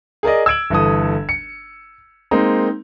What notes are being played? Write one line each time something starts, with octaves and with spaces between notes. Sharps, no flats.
G#4 A#4 D5 D#5
E6 G#6 D7 F#7
G1 E3 A4 D#6
C#7
G#3 A#3 C4 D#4